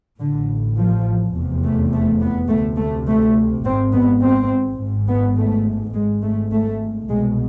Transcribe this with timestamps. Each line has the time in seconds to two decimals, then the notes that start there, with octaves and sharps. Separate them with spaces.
0.19 A1 A2 D3
0.77 F3
1.35 F1 E2 C3
1.63 A3
1.93 A3
2.21 B3
2.49 D2 C3 A3
2.78 A3
3.08 A3
3.64 G#1 G#2 C4
3.93 B3
4.22 C4
4.79 G#1 G#2
5.08 B3
5.36 A3
5.94 G#1 G#2 G#3
6.23 A3
6.52 A3
7.09 C2 B2 G#3